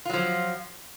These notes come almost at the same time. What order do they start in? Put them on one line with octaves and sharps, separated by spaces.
F4 F#3 F3